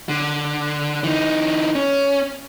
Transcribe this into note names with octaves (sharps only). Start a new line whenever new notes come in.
D3
E3 D#4
C#4